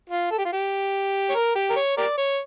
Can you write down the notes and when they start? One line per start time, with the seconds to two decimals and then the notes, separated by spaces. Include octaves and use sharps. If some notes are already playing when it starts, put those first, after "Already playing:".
0.09 F4
0.31 A4
0.38 G4
0.45 F4
0.52 G4
1.29 C#5
1.35 A#4
1.55 G4
1.70 A#4
1.76 C#5
1.97 G4 A#4 D5
2.18 C#5